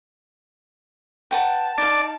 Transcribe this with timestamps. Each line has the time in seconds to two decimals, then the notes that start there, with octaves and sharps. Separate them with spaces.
1.31 B4 F#5 G5 A5
1.78 D#4 D5 F5